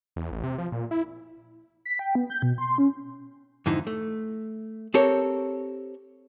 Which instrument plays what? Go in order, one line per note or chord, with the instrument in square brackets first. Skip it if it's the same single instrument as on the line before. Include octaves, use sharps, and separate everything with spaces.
[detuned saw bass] E2
A1
C3
F3
A#2
E4
[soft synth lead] B6
G5
B3
G6
B2
C6
C#4
[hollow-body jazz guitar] F2 G#2 D3 E3 D#4 E4
A3
C4 G4 A4 A#4 C#5